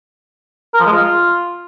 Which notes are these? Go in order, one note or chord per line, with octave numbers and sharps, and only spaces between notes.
A#4
F3
G#3
F4